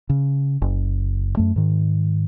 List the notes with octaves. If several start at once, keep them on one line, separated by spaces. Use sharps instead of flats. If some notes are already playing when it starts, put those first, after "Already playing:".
C#3
F#1
F#2 A3
G#2 D#3